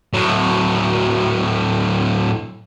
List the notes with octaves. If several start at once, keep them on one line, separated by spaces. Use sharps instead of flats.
A2 F#3